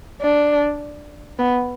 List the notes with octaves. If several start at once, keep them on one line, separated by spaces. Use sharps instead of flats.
D4
B3